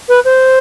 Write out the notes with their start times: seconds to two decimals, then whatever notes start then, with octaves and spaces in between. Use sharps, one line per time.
0.09 B4
0.25 C5